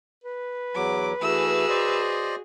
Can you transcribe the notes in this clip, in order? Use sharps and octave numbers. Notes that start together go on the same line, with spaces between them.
B4
E2 F#3 D6
E3 A3 F#4 G#4 E6
C5 D5 D#5